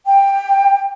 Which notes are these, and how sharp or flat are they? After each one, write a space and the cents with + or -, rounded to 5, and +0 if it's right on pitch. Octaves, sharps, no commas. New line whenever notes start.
G5 +15